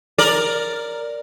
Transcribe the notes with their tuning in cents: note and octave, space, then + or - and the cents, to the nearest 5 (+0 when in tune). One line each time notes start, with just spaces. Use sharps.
A#4 +0 D5 +0